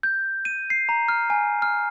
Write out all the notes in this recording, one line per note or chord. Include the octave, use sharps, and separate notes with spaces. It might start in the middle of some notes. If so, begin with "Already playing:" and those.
G6
D#7
C7
A#5
F6
G#5
F6